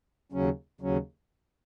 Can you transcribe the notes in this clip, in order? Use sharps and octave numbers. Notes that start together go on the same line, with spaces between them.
D#2 C#3 F#3 C#4
D#2 C#3 F#3 C#4